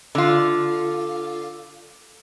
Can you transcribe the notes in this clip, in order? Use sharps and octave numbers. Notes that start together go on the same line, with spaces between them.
D3 F4